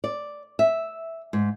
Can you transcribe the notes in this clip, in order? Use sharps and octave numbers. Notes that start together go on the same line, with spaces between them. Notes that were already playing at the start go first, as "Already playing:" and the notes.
D5
E5
G#2